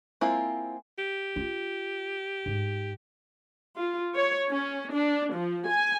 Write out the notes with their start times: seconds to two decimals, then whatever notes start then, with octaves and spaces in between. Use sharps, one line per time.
0.21 G#3 A#3 C4 E4 F4
0.99 G4
1.36 D#4 F4
2.46 G#2
3.78 F4
4.15 C#5
4.51 C#4
4.94 D4
5.36 F3
5.69 G#5